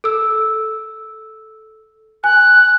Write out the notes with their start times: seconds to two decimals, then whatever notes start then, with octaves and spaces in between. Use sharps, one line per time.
0.04 A4 E6
2.24 G#5 F#6